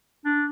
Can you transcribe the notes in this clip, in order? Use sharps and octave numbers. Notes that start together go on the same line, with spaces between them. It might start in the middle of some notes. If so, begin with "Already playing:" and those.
D4